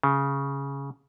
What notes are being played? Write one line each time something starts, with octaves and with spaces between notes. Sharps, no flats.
C#3